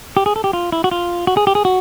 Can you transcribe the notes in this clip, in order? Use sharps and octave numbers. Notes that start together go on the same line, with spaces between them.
G4
G#4
A4
G4
F4
E4
F#4
F4
F#4
G#4
G4
G#4
F#4